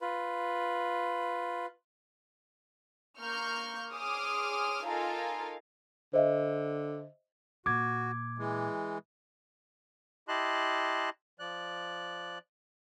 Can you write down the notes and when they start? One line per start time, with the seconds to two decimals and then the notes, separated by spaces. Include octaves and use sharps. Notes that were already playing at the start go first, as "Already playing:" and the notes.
0.01 F4 B4
3.20 A#3 C#6 F6 G6
3.92 G#4 C#5 C6 D6 D#6 F6
4.85 D#4 F4 A4 A#4 F5 G#5
6.13 D3 C5 D#5 E5
7.66 A#2 F#4 D6 G#6
8.38 E3 G#3
10.28 E4 G4 D#5 A5 C6 F#6
11.40 F3 D5 F#6